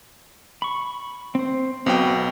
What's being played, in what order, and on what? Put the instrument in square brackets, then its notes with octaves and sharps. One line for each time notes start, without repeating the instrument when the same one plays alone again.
[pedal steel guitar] B5 C#6
C4 C5
[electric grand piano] B1 B2 G5 [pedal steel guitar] B3 C4